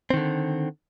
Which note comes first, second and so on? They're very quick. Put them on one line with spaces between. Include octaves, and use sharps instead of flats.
C4 D#3 D3